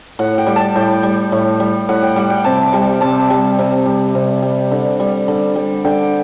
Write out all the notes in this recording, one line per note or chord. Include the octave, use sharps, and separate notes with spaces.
A2 F#5
G5
G3
A5
A2 G5
G3
A2
G3
A2 F#5
G5
G3 F#5
G5
C3 A5
G3 G5
C3 A5
G3
C3
G3
C3
G3
D3
G3
D3
G3
D3 G5